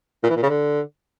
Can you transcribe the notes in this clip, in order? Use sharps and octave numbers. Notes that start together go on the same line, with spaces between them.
A#2
E3
A#2
C#3
D3